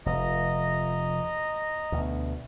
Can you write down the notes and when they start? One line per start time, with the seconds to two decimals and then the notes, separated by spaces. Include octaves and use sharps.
0.06 F1 D#5 A#5
1.92 D2 B2